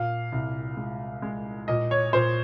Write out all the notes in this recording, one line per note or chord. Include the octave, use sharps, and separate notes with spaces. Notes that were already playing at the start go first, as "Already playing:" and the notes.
Already playing: A#2 F5
C2
G#3
G#3
A#2 D#5
C#5
A#2 C5